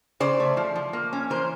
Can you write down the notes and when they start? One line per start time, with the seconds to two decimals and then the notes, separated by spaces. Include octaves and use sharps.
0.20 C#3 C5 D5
0.40 A3
0.57 F3
0.75 F3
0.93 A#3
1.13 C#4
1.30 E3 A#4 C5